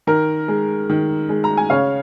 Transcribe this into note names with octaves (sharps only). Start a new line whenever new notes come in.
D#3 A#4
G#3
D#3
G#3
A#5
G#5
C#3 C#5 F5